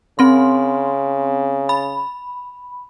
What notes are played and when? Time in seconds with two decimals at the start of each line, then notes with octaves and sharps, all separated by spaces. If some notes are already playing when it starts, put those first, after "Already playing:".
0.19 C#3 C4 C6
1.69 B5